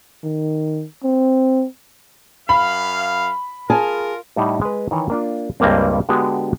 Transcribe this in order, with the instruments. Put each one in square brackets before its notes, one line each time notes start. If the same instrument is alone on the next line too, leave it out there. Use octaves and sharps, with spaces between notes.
[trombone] D#3
C4
[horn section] F#2 F5 [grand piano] B5
[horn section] F4 A#4 [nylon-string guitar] G#4 G#5 A5
[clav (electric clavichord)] A2 G3 D#4 F#5
G#3 B4
D#3 E3 C#5
A#3 D4 F4
C#2 G2 G3 A#3 C4
D3 G#3 B3 D4 F#4 G4